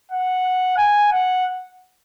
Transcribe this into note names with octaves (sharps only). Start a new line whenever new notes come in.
F#5
G#5
F#5